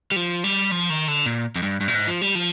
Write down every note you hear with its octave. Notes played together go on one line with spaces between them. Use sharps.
G3
F3
G3
F3
D#3
D3
A#2
F2
G2
G2
A#2
G#2
F3
G3
F3